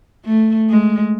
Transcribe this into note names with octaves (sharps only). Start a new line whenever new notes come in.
A3
G#3